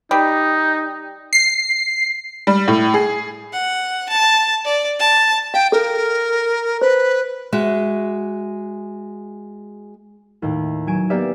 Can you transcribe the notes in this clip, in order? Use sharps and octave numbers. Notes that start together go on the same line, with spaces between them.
G3 D#4
C7
G3
A2
G#4
F#5
A5
D5
A5
F5 G5
A4 A#4
B4 C5
G#3 F#4 E5
D#2 A2
F#3 G#5 D7 E7
A#3 B3 G4 D5 E5